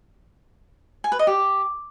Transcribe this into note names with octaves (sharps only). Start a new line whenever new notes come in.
G#5
B4
D#5
G4